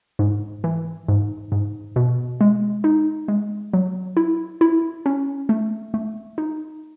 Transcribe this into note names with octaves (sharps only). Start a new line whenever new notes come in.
G#2
E3
G#2
G#2
B2
G#3
D#4
G#3
F#3
E4
E4
C#4
A3
A3
D#4